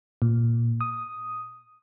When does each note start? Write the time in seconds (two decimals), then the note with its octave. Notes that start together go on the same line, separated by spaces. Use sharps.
0.22 A#2
0.81 D#6